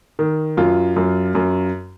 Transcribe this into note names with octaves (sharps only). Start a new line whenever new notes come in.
D#3
F#2 F4
F#2
F#2